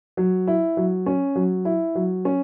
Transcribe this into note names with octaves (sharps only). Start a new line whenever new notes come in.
F#3
E4
F#3
C#4
F#3
E4
F#3
C#4